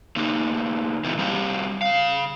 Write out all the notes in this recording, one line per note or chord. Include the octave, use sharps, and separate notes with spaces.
C#3 A#3 D#4
A#2 E3 B3 E4
G3 C4 C5 F5
C#3 F5